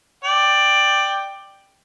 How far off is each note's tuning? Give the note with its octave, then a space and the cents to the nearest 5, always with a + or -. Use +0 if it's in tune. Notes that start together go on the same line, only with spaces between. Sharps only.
D5 +10 G5 +0